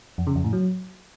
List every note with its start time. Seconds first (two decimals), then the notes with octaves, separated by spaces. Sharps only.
0.18 F2
0.27 C#3
0.35 F2
0.44 A2
0.53 F#3